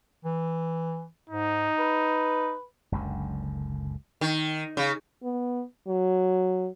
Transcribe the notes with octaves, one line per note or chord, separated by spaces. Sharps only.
E3
G#2 D#4
B4
F#1 C#2 F#2 D3
D#3
C#3
B3
F#3